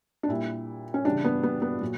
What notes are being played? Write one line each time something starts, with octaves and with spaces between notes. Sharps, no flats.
D4
A#2 G3 E4
C#4
C#3 E3 G3 D4
B3
B3
B3
A#2 F#3